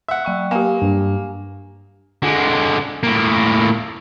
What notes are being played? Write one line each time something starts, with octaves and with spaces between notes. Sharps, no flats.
E5 F#5
F#3 G5 C#6
A#3 G4 G#5
G2
D3 G#3
A2 A#3